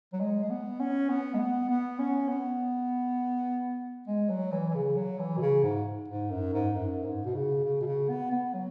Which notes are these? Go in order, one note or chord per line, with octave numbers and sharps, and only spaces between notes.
F#3
G#3
G#3
B3
C#4
B3
G#3
B3
B3
C#4
B3
G#3
F#3
E3
E3
C#3
F#3
E3
B2
C#3
G#2
G#2
F#2
G#2
F#2
G#2
B2
C#3
C#3
B2
C#3
B3
B3
F#3